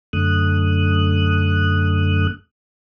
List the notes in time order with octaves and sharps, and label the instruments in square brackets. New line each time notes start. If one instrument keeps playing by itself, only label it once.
[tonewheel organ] F#2 D3 A3 D#6 F#6